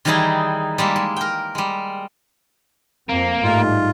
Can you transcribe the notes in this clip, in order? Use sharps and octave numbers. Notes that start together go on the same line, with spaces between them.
D#3 E3 G3 D#4 E4 G#4
G3 G#3 A#3 E5
G#3
A#4 G5
G3 G#3
F2 A#3 C4
A1 G#2 G3 A3 F4